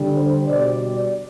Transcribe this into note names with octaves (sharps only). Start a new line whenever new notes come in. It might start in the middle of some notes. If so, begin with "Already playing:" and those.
Already playing: D3 G3
C5
B2 G3 D5
D5